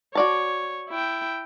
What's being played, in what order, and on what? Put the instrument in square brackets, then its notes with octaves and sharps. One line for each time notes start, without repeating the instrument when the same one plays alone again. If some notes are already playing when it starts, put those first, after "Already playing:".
[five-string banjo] F#4 D5 A5 [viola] C#5
[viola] E4 G5